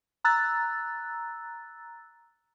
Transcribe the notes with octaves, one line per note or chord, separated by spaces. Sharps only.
A#5 E6 F#6 A6